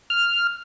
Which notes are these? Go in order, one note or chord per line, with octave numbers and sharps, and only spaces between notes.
F6